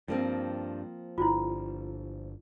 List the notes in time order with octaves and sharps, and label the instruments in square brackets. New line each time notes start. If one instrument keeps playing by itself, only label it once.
[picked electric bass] G2 [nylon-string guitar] F3 A#3 C4
[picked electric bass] G1 [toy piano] E4 F4